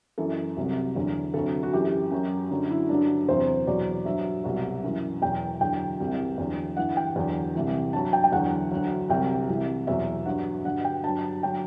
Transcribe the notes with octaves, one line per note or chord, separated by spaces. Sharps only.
F#2 E3 A4
C2 C3 F#3
E2 D3 F#3
D2 C3 F#3 A4
F#4
F#2 E3 G4
F#2 F#3
F#2 D3 F#3
E4
G2 D3 F#3 D4
E2 C3 F#3 C5
E2 B2 F#3 D5
G2 F#3 E5
C2 B2 F#3
F#2 E3
E2 B2 F#3 G5
E2 D3 F#3 G5
C2 C3 E3
E2 D3 F#3
G2 E3 F#5
G5
E2 D3 F#3
C2 C3 E3
G2 F#3 A5
G5
G5
E2 D3 F#3 F#5
D2 D3 F#3
C2 C3 F#3 G5
C2 C3 E3
E2 B2 F#3 E5
G2 F#3 F#5
G2 D3 F#3 F#5
G5
G2 F#3 A5
D3 F#3 G5